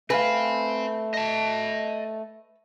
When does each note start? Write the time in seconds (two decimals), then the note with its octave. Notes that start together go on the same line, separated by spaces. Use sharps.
0.10 A3 C4 B4 F5 G#5
1.14 D#5 A5